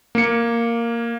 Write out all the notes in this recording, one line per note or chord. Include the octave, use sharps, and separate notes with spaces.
A#3 C#7